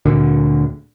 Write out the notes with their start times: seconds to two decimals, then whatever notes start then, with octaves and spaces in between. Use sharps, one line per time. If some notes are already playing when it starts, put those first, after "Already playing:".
0.06 D2 A#2 D3